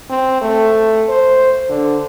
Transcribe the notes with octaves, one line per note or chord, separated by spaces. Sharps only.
C4
A3
C5
D3